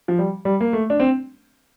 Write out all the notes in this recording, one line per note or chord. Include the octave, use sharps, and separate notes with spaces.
F3
G3
G3
A#3
A3
D4
C4